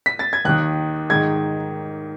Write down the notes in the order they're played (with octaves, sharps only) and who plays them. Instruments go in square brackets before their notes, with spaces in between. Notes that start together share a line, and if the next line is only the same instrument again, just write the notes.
[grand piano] B6
A6
G#6
D#2 D#3 F#6
G#2 D#3 G#6